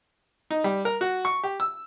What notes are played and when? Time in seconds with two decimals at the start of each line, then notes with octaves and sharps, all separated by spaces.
0.51 D#4
0.64 G3
0.85 A#4
1.01 F#4
1.25 C#6
1.43 G4
1.60 E6